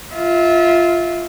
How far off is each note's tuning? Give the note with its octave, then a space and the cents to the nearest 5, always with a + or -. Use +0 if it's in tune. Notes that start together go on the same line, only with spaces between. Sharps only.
F4 -5 E5 -30